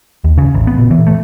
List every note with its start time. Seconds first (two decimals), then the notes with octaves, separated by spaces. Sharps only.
0.24 D#2
0.38 C#3
0.54 A1
0.67 B3
0.78 A#2
0.91 E3
1.07 A3